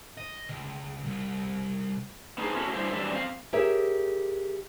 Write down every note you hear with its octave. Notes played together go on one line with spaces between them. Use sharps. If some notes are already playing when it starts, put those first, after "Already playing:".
D#5
C#2
C2
B3 D4 D#4 G#4 A4 C5
C#4 E4 F#4 A4
G2 E4 C5
E3 F#3 G3 D4 D5 E5
C4 F5
G4 G#4 A#4 C#5 E5